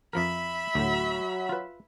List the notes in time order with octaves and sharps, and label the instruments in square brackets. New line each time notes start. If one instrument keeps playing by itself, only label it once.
[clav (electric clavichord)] F2 F3 A#4 [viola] E5 B5
[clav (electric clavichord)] D2 A2 [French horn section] F#3 F#4
[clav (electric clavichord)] F4 B4